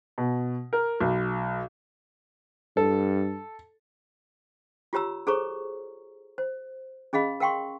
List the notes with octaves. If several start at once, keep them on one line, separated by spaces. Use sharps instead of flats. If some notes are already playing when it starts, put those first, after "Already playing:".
B2
A#4
B1
G2 A4
F4 G4 C#5 A#5 E6
G#4 A4 C5 C#5 A#5 C#6
C5
C#4 G#4 D#5 F5 B5
A#4 F5 G5 C6 C#6